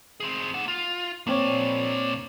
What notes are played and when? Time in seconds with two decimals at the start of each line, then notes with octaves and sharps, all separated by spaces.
0.20 C4 G#4
0.54 A#3 F#5
0.68 F4
1.27 A#2 A#3 C4 D4 C#5